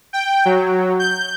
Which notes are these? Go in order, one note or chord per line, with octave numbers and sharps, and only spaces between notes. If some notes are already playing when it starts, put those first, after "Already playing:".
G5
F#3
G6